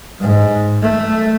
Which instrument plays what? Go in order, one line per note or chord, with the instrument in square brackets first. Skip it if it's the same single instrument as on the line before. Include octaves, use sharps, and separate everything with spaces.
[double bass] G#2
A3